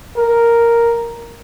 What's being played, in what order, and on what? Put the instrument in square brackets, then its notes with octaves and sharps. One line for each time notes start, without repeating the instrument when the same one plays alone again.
[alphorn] A#4